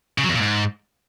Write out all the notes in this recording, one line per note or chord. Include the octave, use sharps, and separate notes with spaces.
C#3
F#3
E2
A#2
G#2